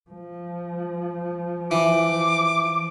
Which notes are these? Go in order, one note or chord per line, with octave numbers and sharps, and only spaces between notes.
F3
E3 D6